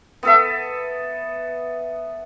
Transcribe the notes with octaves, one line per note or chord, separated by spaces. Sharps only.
B3 A4 E5